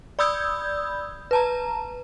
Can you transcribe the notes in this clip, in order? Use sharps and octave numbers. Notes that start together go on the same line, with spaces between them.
D5 B5 D#6 E6 G6 G#6
B4 A5 A#5